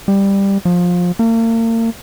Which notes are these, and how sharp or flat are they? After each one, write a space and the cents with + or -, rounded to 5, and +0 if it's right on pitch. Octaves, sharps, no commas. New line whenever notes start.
G3 +10
F3 +20
A#3 -40